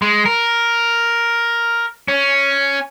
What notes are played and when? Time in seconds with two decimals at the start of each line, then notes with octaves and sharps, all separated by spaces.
0.02 G#3
0.26 A#4
2.08 C#4